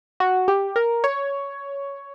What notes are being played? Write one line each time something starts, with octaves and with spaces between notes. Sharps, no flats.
F#4
G4
A#4
C#5